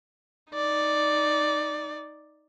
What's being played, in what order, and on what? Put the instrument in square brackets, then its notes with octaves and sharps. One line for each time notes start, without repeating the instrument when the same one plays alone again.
[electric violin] D#4 D5